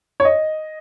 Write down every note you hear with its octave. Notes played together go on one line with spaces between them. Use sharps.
C#5
D#5